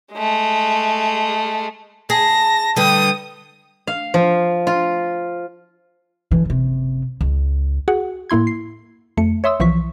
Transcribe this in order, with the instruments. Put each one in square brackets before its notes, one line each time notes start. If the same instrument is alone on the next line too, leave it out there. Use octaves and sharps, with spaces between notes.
[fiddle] G#3 A3
[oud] G#4 [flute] A5 [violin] A#6
[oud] D3 G3 B4 [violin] D#6
[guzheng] F5
F3
F4
[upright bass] D3 E3
F#1 C3
C#2
[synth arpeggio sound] F#4 G#4 F#5
A2 A#3 E4 C6 G#6
C7
F2 A3 C#7
C#5 E5 C6 D#6 E6
B1 E3 F3 C#6 B6